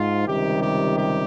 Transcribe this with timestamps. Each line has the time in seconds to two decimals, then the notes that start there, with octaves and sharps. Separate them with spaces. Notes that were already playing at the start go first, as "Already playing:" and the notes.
Already playing: G#2 F4
0.26 C#2 C3 D#3 G3 G4
0.61 G4
0.95 G4